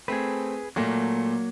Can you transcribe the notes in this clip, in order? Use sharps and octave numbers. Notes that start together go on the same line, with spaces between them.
A3 C4 G#4 B4
A#2 F#3 A3 A#3 A#6